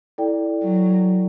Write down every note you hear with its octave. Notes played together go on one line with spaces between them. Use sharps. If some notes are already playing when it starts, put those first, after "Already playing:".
E4 A4 D5 G5
F#3